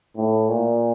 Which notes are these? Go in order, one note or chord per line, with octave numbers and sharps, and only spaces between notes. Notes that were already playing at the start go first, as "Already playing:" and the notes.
A2
A#2